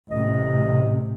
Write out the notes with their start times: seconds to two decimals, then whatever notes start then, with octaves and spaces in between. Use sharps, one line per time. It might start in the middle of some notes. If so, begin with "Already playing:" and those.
0.11 A1 C3 D#5